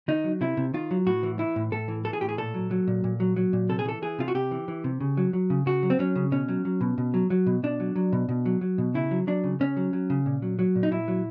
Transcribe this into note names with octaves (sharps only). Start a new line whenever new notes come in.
D#3 D#4
F#3
C3 E4
C3
D#3 F4
F#3
A2 F#4
E3
E3 E4
A2
A2 A4
E3
E3 A4
G#4
A2 G4
G#4
A#2 A4
F#3
F#3
A#2
A#2
F#3
F#3
A#2
C3 A4
G#4
E3 A4
E3 G#4
C3 F4
F#4
C3 G4
E3
E3
C3
C#3
F#3
F#3
C#3
C#3 F#4
F#3
C4
F#3 C#4
C#3
B2 C#4
F#3
F#3
B2
B2
F#3
F#3
B2
B2 D4
F#3
F#3
B2
B2
F#3
F#3
B2
C#3 E4
F#3
F#3 D4
C#3
C#3 C#4
F#3
F#3
C#3
A#2
F#3
F#3
A#2
D#4
A#2 E4
F#3